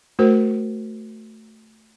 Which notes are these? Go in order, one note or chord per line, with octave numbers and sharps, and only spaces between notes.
A3 F#4 A#4 C5